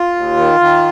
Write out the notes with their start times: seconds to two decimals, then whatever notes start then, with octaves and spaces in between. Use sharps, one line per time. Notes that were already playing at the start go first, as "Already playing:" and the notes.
Already playing: F4
0.15 D#2
0.37 D#3
0.60 D#3